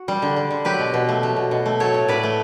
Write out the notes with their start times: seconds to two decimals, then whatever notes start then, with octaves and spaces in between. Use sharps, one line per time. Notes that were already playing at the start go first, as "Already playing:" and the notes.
Already playing: F#4
0.08 G3
0.22 D3
0.36 G3
0.51 D3
0.65 F#3 G4 B4
0.79 B2
0.94 B2
1.09 A3
1.23 F#3
1.36 B2
1.51 B2
1.66 A3
1.80 F#3 A4 C#5
1.94 A2
2.08 A2 B4 D5
2.23 A3